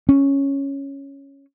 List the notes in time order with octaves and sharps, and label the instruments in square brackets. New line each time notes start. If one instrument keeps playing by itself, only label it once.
[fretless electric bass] C#4